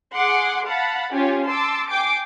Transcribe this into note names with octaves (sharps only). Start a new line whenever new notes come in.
G#4 F#5 C6 D6
F5 F#5 A5 B5
C#4 F4 G4 C#5 G#5
A5 C6 D6 E6
G5 G#5 D6 C7 D7